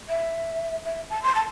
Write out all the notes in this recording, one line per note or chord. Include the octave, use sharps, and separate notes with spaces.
E5
E5
A5
C6
A5